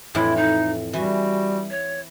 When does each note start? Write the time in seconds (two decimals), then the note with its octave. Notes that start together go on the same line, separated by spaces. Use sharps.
0.15 F2 A2 E3 E4
0.37 D#4
0.93 E3 G3 F#4 G#5
1.70 C#5